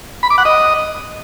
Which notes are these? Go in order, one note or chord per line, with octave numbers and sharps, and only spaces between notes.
B5
D6
F#5
D#5